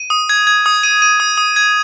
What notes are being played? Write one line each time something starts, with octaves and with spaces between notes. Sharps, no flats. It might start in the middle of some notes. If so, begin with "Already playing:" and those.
Already playing: D#7
D#6
G#6
G#6
D#6
D#7
D#7
D#6
D#6
G#6